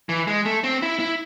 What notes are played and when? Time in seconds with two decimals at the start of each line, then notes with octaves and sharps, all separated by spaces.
0.09 E3
0.27 G#3
0.45 A3
0.64 C4
0.82 E4
1.00 E4